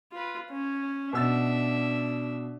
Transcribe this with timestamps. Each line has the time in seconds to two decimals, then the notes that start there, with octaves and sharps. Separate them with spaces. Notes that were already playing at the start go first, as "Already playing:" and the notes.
0.12 F4 B4
0.50 C#4
1.13 B2 D4 E5 E6 A6